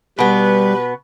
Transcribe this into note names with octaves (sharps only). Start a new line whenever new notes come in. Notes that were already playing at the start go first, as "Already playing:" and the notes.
B2 G3 B3 B4